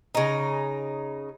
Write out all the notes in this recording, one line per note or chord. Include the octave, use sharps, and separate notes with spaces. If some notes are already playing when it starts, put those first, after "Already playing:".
C#3 D#4